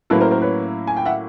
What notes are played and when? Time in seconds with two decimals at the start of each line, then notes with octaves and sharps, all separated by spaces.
0.10 A2 F#3 A#3 C#4 E4 A4 B4
0.21 A#4 C5
0.31 A#4 C5
0.42 B4 C#5
0.87 G#5
0.97 G5
1.06 E5 F#5